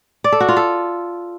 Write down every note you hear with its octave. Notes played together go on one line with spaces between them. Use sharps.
D5
A4
F#4
F4
A4